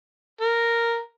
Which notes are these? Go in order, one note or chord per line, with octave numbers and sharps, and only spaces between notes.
A#4